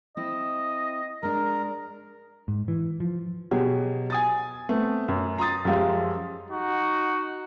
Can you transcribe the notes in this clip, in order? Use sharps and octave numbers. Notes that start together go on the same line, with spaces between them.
C4 E4 D#5
G#3 D4 A#4 A#5
G#2
E3
F3
B2 F#3 G4 G#4
G#5 D#6 A6
A3 B3 C4
F#2
A#5 C6 D#6 A6
F#2 F3 G#3 G4 F5
D#4 F#4